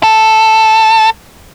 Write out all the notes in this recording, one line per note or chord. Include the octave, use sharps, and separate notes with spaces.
A4